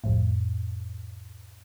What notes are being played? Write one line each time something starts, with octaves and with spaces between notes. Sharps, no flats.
C2 F2 A2